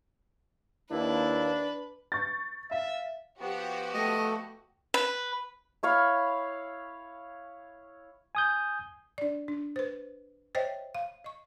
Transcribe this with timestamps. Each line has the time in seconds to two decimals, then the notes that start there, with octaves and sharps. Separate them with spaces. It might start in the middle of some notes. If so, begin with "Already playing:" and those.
0.91 D#2 A#3 D4 E4 B4
2.12 C#6 G6 A6
2.71 E5 F5
3.41 F3 B3 F#4 G4
3.94 A3 D#5
4.94 B4
5.83 E4 C#5 F5 B5
8.35 G#5 D#6 G6
9.18 D4 D5
9.48 D4
9.76 B4 C5
10.55 C5 C#5 D#5 E5 G5
10.95 F5
11.24 D#5 C#6